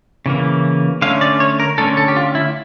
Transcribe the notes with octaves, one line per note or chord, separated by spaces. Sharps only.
C#3 E3 A#3
D3 A3 C#4 F5
D5
C#5
A#4
D3 A3 C#4 A4
A4
G4
F4
E4